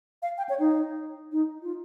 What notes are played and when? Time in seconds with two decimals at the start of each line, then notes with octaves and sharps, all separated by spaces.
0.22 F5
0.38 G5
0.49 C#5
0.60 D#4
1.32 D#4
1.62 F4